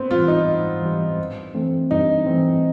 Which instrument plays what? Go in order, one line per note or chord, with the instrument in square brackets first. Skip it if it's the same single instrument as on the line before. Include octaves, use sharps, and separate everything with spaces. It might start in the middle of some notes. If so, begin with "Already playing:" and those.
Already playing: [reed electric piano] G#2 [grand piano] B3 C4
[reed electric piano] E3 G3 [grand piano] F4
[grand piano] D#4
[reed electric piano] G#2
E3 G3
G2
E3 A3 C4
[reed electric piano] G2 [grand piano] D#4
[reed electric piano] E3 A3 C4